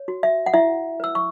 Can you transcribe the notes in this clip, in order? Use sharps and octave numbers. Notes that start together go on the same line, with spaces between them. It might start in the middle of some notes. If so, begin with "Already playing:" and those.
Already playing: C#5
F#4
E5
F#5
E4 E5
B4 E6
C#6